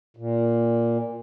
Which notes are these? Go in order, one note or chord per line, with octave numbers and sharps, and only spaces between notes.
A#2